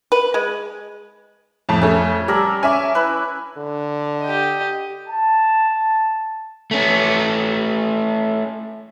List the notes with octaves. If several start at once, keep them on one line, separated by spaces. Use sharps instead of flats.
B4
G#3
F2 A2 A5
F2 A3 C#4
G3 A4 A#4 D5
C#4 E5 G#5 D6
E4 B4
D3
G4 D#5
A5
A3 C#4